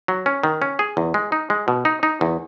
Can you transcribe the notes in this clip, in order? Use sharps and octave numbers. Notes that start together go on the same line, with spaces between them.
F#3
C#4
D#3
C#4
G#4
E2
G#3
D#4
G#3
B2
D#4
D#4
E2